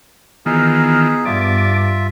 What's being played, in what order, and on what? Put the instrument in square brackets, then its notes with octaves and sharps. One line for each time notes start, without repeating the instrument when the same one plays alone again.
[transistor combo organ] D#3 E3 F4 [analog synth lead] B3 [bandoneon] D#4 G#4
[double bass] G2 [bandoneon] F4 E5 [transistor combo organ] D5